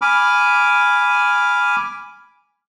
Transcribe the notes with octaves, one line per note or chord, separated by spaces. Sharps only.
G#5 B5 D6 F6